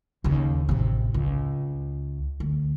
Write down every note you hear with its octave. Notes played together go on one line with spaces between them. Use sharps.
D#2 C#3
A1 C3
C#2
D2